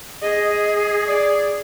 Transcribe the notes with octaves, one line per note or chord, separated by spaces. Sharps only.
G#4 D#5
D#5
D5